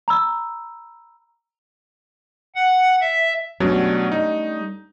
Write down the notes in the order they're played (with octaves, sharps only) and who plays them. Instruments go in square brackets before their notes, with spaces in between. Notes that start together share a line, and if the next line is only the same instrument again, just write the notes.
[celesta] A#5 B5 E6
[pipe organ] F#5
E5
[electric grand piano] B2 F#3 [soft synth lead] G3 [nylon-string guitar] A3 C#4 D4
[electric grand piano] D#4